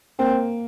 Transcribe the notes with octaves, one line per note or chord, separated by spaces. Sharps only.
A#3 C4